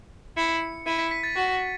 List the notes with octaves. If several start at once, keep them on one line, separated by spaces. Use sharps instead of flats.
E4 C#7
E4 D#7
B6
B6
A6
F#4